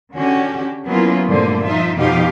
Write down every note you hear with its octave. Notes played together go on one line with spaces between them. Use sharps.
D3 C#4 F#4 G4
F#3 A#3 B3 C#4 E4 F4
G2 A#2 D3 G3 A3 C5
F3 D#4 F4 E5
F2 B2 F3 D#4 G4 F5